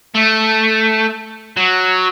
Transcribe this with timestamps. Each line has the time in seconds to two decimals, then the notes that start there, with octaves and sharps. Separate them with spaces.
0.14 A3
1.57 F#3